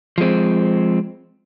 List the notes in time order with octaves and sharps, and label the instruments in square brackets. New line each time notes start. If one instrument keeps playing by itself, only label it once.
[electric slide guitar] F3 G#3 C4